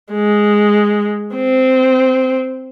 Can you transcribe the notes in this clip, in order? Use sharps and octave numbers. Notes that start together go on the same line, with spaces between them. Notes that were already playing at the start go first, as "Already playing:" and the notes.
G#3
C4